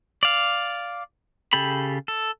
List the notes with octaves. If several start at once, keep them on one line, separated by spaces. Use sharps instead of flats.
D5 F5
C#3 G4 A4 B5
A4